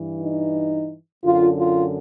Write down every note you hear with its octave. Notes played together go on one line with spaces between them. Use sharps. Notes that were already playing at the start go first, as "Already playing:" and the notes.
Already playing: G2 E3
D#4
F#2 D3 F4
F4